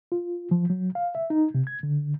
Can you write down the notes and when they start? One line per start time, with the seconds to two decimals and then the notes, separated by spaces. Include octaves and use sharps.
0.12 F4
0.51 F3
0.70 F#3
0.95 F5
1.15 E5
1.30 D#4
1.55 C3
1.67 G#6
1.83 D3